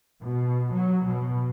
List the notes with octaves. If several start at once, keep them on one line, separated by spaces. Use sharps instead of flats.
B2
F#3
B2